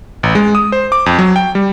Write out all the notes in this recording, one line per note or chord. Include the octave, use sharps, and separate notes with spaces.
A1
G#3
D#6
C5
D6
F2
F#3
G5
G3